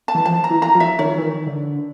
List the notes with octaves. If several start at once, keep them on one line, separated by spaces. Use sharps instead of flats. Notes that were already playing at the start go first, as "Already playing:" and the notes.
A5
E3
F3 A5
A#5
E3
A#5
F3
E5
D#3 C#5
E3
D#3
D3